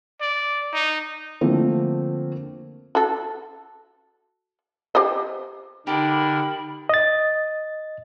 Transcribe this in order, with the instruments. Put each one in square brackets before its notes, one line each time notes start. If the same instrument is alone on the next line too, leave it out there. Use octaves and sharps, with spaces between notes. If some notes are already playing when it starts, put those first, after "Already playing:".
[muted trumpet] D5
D#4
[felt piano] D3 F3 A3 A#3 C4
[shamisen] F#4 A4
G4 C5 D#5
[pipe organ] D3 A#4 [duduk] D#4 [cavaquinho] G4 A4 [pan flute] B5
[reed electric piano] D#5 A6